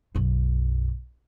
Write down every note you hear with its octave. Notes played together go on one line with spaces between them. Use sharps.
B1 F#2